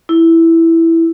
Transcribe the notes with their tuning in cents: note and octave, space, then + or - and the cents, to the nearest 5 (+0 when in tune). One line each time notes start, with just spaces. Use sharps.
E4 +0